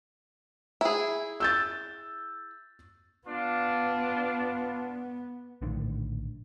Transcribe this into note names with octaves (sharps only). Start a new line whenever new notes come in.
E4 G#4
E6 G6 A6
B3 D4 F4
A#1 A2 D3 D#3